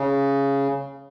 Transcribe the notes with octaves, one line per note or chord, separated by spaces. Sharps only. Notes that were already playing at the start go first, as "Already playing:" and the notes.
Already playing: C#3